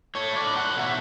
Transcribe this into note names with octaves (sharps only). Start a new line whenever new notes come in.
A3 C#5
D5
A2
F#5
B2 E5